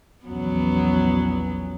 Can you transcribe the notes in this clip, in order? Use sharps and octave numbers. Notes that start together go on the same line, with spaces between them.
A#1 E2 F#3 B3 C#4